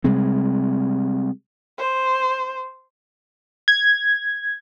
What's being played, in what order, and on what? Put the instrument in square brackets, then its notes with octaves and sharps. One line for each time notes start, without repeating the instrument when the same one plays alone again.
[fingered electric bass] C3 G3 G#3 C4
[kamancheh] C5
[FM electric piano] G#6